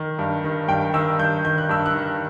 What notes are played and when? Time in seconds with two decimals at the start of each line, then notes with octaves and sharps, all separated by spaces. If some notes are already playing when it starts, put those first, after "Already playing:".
Already playing: D#3
0.19 G2
0.44 D#3
0.68 G2 G5
0.94 D#3 E6
1.19 G2 G6
1.45 D#3 G6
1.58 F#6
1.69 G2 E6
1.86 F#6
1.94 D#3